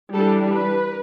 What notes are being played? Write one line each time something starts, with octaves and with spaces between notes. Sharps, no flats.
E3 G3 D4 A4
B4